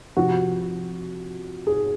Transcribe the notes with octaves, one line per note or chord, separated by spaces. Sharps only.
C3 F3 F#4
G#4